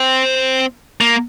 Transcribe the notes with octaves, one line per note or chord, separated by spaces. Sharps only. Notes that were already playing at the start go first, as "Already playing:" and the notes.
Already playing: C4
A#3